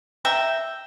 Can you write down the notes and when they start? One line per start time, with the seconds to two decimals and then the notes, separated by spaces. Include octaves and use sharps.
0.25 E5 G5 A#5